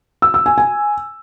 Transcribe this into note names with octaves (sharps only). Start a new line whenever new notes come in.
E6
E6
G#5
G#5